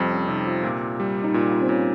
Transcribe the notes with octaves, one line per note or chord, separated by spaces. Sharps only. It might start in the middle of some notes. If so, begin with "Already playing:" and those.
Already playing: F2 C3 G3 C5
C#4
C3 D#4
F4
A#2
G3
D#4
A#2 F4
F4
C4
A#2 C#4